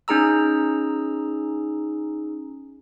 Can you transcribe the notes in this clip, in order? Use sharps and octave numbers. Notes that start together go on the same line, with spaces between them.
C#4 D#4 G#4 A#5 E6